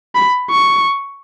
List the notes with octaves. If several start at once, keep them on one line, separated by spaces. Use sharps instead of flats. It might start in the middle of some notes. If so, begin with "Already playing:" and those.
B5
C#6